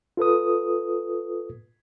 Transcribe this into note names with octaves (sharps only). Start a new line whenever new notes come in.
F4 A4 B4 D#6